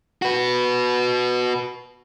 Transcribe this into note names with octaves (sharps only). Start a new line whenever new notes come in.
F#4 B4